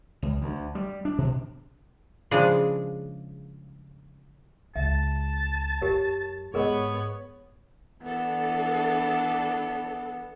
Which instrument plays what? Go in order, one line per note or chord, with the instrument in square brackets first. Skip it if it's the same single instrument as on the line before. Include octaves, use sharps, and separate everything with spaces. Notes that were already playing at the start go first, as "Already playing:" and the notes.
[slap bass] C#2
D2
G3
D4
B2
[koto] C#3 F3 G#3 D4 G#4
[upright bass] C#2 C#3 [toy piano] E5 [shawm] A5
[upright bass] F#2 [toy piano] G4 A#4 C#5
[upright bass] G#2 [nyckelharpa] B3 C#5 [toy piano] G#4 A#4 D#5
[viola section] E3 D4 A4 [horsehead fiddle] B3